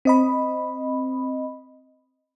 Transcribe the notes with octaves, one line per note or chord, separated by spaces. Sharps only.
C4 D#5 B5